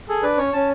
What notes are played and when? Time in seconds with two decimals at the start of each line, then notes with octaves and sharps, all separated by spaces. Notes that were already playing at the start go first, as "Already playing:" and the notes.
0.08 G#4 A4
0.23 D4 B4
0.38 C#4 C#5
0.53 C#4 A5